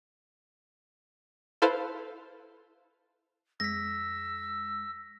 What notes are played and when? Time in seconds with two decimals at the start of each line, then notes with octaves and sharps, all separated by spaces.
1.62 E4 A4 B4 C5 F5
3.60 F2 G#3 E6 A#6 B6